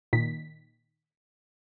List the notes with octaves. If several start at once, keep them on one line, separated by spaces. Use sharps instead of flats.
A#2 D#3 B6